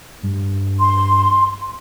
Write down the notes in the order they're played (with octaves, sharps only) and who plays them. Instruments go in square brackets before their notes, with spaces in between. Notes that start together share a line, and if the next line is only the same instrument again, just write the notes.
[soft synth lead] G2
[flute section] C6